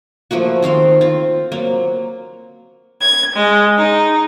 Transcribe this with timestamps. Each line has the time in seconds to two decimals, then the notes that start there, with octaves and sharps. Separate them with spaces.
0.31 F3 A3 A#3 F#4
0.62 D#3 C4 F5 C6
1.01 C4 F4
1.52 F#3 A#3
3.00 G#6
3.35 G#3
3.78 D#4